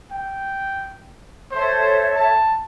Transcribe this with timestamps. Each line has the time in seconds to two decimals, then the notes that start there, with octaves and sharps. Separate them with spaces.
0.12 G5
1.52 A4 C5 C#5 E5
2.16 A5